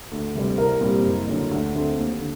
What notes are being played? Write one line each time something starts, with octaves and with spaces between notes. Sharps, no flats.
D2
C3 G3 C4
C2 A#4
A#2 G3 C4
F#1
F#2 D3
D2
D3 A3 C4
D#2
D3